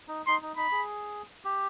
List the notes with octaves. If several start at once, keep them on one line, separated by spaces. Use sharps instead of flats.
D#4
D#4 C6
D#4
D#4 B5
G#4
G4